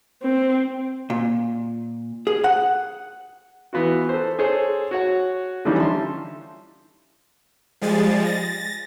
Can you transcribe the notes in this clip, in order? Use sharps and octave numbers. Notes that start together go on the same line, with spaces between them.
C4
A#2
G#4
F#5
E3 B3 F4 F#4
A4 C5
G#4 A4 C5 C#5
F#4 C#5 F#5
D3 E3 F3 G3 C#4 D#4
E5 A5 C6
F3 G3 G#3 G#4 A6
A6 A#6